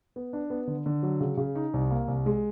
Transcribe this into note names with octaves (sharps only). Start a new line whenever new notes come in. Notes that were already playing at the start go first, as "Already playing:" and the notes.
B3
D4
B3
D3
D3
F#3
C#3
C#3
D#4
C2
A#3
C2
G#3